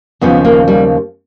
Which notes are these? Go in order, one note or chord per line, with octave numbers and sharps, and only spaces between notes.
D#2 C#3 F3 B3
A#3
G3